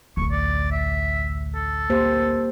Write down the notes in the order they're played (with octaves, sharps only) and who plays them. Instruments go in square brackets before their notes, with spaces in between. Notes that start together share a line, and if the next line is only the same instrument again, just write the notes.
[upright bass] A1 D2 [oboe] C#6
[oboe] D5
E5
A4
[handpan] A#3 G4 C5